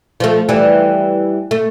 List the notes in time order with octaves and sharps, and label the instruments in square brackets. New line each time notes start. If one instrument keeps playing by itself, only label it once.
[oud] F3 A3
E3 G3
A3